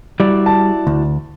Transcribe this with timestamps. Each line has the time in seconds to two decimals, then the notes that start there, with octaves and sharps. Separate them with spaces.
0.20 G3 E4 F#4 D5
0.46 A5
0.87 D2